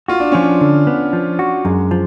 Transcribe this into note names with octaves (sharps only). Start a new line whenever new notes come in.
F4 F#4
D4
F3 C#4
D4
D3
B3
F3
F#4
F#2 G#3
F3